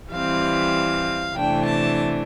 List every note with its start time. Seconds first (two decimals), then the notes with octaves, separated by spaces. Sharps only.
0.10 E3 G3 C4 F5
1.34 C3 E3 A3 D4 G5
1.66 A5